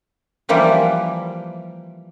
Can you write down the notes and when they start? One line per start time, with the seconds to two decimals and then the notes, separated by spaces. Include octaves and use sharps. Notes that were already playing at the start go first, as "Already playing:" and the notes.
0.49 E3 F3 G3 A#3 G4